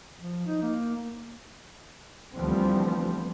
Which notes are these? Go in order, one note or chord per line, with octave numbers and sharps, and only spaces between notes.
F3
D#4
A#3
D2 E3 F3 G3 B3 C4